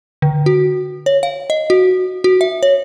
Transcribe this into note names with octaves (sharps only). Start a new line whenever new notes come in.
D3
F#4
C#5
F5
D#5
F#4
F#4
E5
C#5